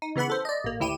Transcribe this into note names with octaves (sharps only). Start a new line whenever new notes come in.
D#4
C#3 E3 B3 F#5 B5
A4 C5
D5 D#5
A1 A#3
D2 E4 G4 D#7 E7